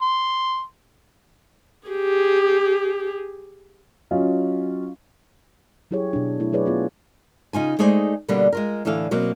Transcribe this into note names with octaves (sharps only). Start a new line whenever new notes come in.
C6
G4 G#4
F#3 C#4 F4 D#5
F#3 E4 G4 G#4 C#5
B2 D4
A3 E4
F#3 G4 G#4 B4 C#5 D5
B3 F4 G#4
C#3 D#4 F4 G#5
G#3 A3 D#4 G#4 C5 D5
B2 D3 G3 A#3 B3 D4
G#3 F4 A#4
A2 D3 E3 A4 F5
B2 F#3 A#3 C4